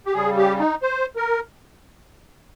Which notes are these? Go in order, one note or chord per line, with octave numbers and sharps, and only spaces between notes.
G4
C#3 G3 G#4
G4
D#4
C5
A#4